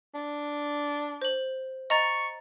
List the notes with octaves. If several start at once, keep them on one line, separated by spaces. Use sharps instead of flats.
D4
C5 F#7
D#5 A#5 C#6 A6